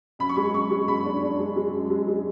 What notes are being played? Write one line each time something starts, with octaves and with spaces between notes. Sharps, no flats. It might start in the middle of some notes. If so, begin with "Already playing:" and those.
F#2 B5
C#6
G#3 B5
F#2 C#6
G#3
F#2 B5
D4
D4
G#3
G#3
F#2
G#3
G#3